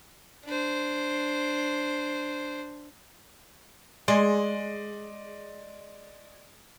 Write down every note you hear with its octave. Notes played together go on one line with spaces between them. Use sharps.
D4 C5
G#3 D5 D#5 C6